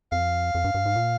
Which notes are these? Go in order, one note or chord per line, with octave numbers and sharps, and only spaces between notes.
F2 F5
F2
G2
G2
G#2
A#2